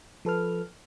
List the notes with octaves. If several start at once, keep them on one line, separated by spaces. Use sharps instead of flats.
F3 A4 B4 F6